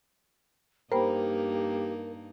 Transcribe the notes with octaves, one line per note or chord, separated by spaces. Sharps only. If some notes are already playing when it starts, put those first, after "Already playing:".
G2 A#3 D#4 G4 A#4 C5 G5 B5